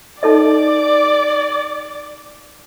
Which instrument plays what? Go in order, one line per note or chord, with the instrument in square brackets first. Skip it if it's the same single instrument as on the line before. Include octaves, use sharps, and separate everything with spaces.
[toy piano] D#4 A4 D#5 [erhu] D5